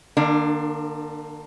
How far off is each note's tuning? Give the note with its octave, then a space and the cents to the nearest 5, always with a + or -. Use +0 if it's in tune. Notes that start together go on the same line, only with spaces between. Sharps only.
D3 +45 A#3 +0 D4 +10